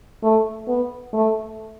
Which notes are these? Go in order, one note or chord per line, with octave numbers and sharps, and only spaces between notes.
A3
B3
A3